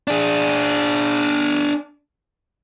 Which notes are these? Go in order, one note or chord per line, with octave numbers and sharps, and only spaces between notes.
D4 G#4